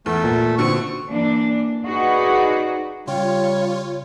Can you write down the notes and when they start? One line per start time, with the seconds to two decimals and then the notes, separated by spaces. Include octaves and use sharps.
0.06 E2 A3
0.24 A#2
0.58 B2 D3 C4 C#6
1.10 E3 A#3 D4
1.85 D#4 F#4 G#4 B4 D5
3.07 C#3 G3 F4 C#5 G5